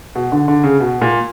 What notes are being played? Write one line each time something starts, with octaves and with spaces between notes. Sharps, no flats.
B2
D3
D3
C#3
B2
A#2